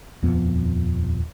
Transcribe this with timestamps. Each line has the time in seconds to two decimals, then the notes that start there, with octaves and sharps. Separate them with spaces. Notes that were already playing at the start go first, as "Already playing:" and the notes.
0.23 D#1 F2 F3 B3